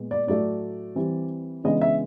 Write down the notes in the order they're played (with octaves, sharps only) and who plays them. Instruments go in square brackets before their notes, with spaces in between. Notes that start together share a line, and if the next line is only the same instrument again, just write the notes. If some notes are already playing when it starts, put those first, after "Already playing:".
Already playing: [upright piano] A#2 G#3 B3
D5
A2 F#3 A3 D5
E3 G3 C4
C#3 E3 G#3 B3 D4 D#5
E5